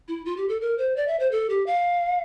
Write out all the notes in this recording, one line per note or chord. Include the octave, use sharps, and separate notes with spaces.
E4
F4
G4
A4
A#4
C5
D5
E5
C5
A4
G4
F5